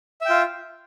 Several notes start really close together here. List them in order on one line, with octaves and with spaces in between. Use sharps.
E5 G5 F4